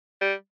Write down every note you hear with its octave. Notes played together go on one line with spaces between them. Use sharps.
G3